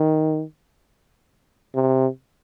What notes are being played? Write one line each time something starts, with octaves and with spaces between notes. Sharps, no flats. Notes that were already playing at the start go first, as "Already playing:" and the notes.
Already playing: D#3
C3